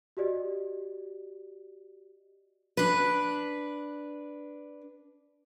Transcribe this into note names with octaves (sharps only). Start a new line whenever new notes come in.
F#4 G4 D5 D#5
D4 B4